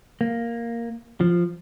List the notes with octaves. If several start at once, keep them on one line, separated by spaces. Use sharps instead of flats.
A#3
F3